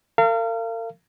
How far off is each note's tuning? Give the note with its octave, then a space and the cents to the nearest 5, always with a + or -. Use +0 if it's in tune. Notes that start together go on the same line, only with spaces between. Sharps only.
A#4 -45 F5 -30